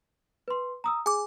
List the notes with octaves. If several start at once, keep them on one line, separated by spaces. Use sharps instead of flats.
B4 C6
A#5 D#6 E6
G#4 G#5 D6